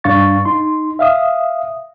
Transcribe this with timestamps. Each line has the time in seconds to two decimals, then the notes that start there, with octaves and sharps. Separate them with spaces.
0.04 G2 D4 F5 C#6 A6
0.45 D#4 C6
0.99 E5 F5 D#6